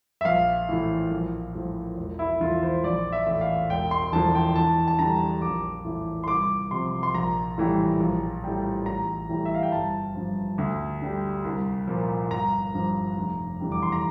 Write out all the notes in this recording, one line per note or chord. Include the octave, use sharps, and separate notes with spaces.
E5
A#1 F5
A2 E3
A#1
A2 F3
E1
E4
E2 D3 F3 F4
C5
A#1 D5
E5
A2 E3
F5
E1 G5
C6
E2 D3 F3 A5
G5
E2 A5
A5
D3 G3 A#5
A#1 D6
A2 E3
C6
C2 D6
C3 F3 C6
C6
A#1 A#5
A2 E3 G3
A#1
A2 G3
A1 A#5
A2 E3 G3
E5
F5
G5
G1 A5
G2 F3
D2
D3 G3
C2
A#2 F3
G1 A#5
G2 F3
F1
E2 D3 G3
D6
C6
A#5